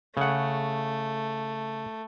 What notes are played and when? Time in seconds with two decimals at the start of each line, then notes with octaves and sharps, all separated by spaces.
0.17 C#3 A3 F#5